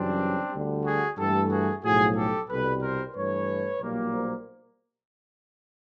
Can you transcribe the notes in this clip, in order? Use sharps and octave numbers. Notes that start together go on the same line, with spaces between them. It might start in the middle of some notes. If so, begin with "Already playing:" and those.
Already playing: F#2 C#3 E3 G3 C4 D4
D2 D3 G3
F#4 G#4
G2 E3 A3 G4 A4
F#4 G#4
B1 A2 F3 F#4 G#4
G4 A4
C2 B2 G3 A4 B4
A#4 C5
G2 E3 A3 B4 C#5
B1 A#2 G3 A#3
A#4 C5